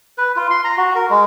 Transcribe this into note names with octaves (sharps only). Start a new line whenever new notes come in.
B4
F4
C6
A#5
F#4
A#4
G#3